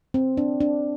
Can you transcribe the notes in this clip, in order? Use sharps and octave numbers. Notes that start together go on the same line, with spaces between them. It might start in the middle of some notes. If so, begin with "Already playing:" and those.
C4
D4
D4